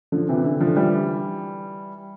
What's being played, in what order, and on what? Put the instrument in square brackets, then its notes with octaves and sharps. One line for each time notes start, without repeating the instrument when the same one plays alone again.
[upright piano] D3 F3
C3 E3
D3
D3 F3
E3 G3